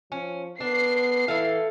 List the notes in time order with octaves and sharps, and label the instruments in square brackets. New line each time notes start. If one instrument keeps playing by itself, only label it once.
[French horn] F3 [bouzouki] C#4
[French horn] B3 [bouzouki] D4 [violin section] C7
[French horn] E3 [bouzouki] E4 A4 F5